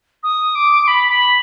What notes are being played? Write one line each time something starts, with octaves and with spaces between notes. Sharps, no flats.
D#6
D6
B5
B5